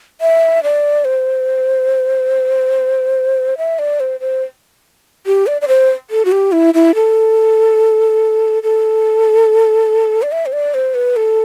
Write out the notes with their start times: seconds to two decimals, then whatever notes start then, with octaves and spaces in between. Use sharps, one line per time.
0.21 E5
0.63 D5
1.05 C5
3.58 E5
3.79 D5
4.00 C5
4.20 C5
5.26 G4
5.47 D5
5.61 D5
5.68 C5
6.10 A4
6.25 F#4
6.32 G4
6.52 E4
6.74 E4
6.95 A4
8.63 A4
10.22 D5
10.32 E5
10.46 C5
10.53 D5
10.74 C5
10.94 B4
11.16 A4